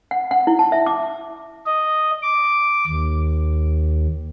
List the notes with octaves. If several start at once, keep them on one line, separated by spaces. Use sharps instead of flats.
F#5
F#5
E4
A5
E5
D6
D#5
D6
D#2